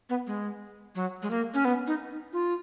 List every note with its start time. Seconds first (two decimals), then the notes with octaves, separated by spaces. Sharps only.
0.09 B3
0.27 G#3
0.95 F#3
1.22 G#3
1.30 A#3
1.54 C#4
1.65 B3
1.87 D#4
2.33 F4